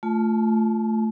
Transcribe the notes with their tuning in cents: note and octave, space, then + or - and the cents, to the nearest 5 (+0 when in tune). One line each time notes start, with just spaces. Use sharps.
A3 +0 F4 +0 A5 -45